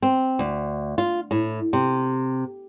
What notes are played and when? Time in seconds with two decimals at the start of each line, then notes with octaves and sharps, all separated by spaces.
0.02 C4
0.39 D2
0.98 F4
1.31 A2
1.73 C3